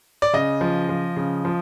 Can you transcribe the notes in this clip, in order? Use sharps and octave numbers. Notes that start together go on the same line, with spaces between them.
D5
C#3 D#5
F3
F3
C#3
F3